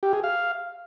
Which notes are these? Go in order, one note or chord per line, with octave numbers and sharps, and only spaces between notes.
G4
G#4
F5